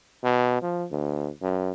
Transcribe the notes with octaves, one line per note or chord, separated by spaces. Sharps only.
B2
F3
D2
F#2